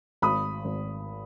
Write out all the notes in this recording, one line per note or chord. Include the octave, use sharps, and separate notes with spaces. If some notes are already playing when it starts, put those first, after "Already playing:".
G#1 B5 D#6
G#1